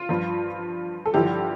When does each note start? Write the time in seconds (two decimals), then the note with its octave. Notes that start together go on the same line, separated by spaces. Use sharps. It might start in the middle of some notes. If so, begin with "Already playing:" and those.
Already playing: F4
0.09 G2 F3
1.06 A4
1.14 G2 D3 F3 E4 G4